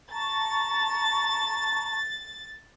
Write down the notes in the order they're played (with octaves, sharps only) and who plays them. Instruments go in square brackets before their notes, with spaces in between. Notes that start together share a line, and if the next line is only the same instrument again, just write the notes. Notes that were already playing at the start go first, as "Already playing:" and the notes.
[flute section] A5 A#5 C#6 [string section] A6